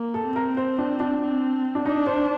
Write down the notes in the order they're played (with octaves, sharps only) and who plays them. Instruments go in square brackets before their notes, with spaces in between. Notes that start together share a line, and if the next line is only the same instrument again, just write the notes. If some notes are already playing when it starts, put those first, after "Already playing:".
Already playing: [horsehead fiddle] A#3
[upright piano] A4
[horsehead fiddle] C4
[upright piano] A#4
C5
D4
D4
[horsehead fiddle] C4
[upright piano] D4
[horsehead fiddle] D4 [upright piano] D#4
[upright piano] C5